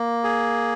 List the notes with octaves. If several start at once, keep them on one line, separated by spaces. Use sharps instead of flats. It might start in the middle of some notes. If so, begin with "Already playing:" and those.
Already playing: A#3
G#4